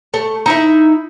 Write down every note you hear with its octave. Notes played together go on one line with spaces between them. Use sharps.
A3
D#4 E4 E5